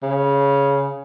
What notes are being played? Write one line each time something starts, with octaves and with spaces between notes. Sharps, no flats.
C#3